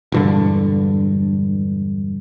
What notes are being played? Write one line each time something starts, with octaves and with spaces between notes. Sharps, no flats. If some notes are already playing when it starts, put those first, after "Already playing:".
E1 G2 D3